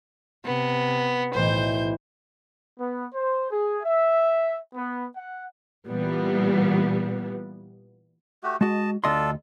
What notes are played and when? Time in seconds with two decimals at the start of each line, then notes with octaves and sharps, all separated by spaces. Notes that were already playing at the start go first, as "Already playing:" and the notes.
0.46 C3 B3
1.35 B1 A2 E3 C5 G6
2.79 B3
3.14 C5
3.51 G#4
3.83 E5
4.76 B3
5.15 F#5
5.88 A#2 E3 G3 B3
8.43 A3 F#4 G4
8.61 G#3 F#4 D#5 A5
9.04 D2 D4 F4 A4 D#5 C6